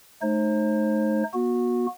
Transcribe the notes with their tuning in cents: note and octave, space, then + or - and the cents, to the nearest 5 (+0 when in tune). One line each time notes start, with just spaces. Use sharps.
A3 -35 D#4 -20 C5 +35
B3 -40 F#4 -25